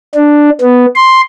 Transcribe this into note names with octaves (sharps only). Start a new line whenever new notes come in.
D4
B3
C6